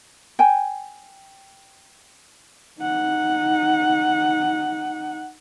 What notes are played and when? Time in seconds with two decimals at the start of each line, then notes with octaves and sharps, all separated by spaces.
0.39 G5 G#5
2.79 D#4 F#5